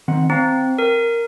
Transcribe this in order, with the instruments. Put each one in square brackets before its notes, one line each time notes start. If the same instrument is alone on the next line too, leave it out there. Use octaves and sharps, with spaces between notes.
[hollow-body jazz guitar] D#3 C4 F#5
[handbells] C4 [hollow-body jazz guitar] F5 A5 A#5
[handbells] A#4